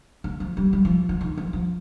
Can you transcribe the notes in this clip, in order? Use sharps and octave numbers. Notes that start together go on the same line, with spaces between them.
D3
F3
G3
G3
F3
F3
D#3
F3
F3